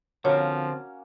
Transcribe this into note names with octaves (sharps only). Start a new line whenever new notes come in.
D3 F3 A#3 C4 C#4 F#4 C#5